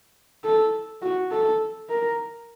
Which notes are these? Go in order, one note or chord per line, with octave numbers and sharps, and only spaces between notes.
A4
F#4
A4
A#4